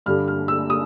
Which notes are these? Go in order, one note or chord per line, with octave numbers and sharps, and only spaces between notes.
G2 D3 G3 F6
F6
E6
D#6